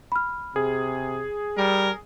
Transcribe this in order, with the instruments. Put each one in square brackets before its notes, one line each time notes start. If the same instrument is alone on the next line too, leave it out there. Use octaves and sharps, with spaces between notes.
[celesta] B5 F6
[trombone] C3 [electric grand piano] G#4
[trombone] G3 [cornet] A#4